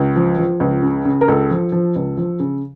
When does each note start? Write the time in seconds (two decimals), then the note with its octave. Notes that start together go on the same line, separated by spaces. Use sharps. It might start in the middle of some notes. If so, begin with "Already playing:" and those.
Already playing: C#2
0.16 F3
0.38 F3
0.60 C#2
0.82 C#3
1.05 C#3
1.21 A#4
1.28 C#2 A4
1.50 F3
1.72 F3
1.95 C#2
2.17 F3
2.40 C#3